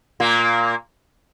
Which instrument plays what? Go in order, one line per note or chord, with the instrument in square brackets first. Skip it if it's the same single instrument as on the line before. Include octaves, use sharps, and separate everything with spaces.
[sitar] A#2 A#3